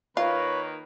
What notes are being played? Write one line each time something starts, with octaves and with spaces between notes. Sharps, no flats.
D#3 A#3 F4 B4 C#5 B5